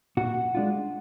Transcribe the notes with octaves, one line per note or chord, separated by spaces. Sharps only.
A#2 F#4
G#3 D4 F4